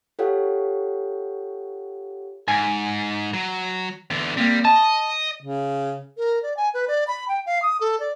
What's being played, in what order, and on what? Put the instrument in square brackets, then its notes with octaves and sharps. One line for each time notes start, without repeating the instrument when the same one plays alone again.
[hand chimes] F4 G4 A4 C#5 F5 F#5
[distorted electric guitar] G#2 [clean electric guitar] G#5
[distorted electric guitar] F#3
E2 D3
[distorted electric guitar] G3 [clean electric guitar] A#3 C4
[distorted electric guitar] D#5 [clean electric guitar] A5
[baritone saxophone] C#3
[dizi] A#4
D5
G#5
B4
D5
B5
G5
F5
D#6
A4
D5